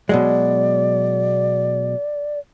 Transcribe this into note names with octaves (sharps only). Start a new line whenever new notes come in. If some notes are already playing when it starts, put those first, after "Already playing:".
B2 F#3 G#3 D5